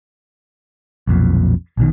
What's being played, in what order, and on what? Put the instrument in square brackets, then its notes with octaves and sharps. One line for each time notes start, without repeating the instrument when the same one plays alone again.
[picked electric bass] B1 F2 A#2
A#1 B2 D#3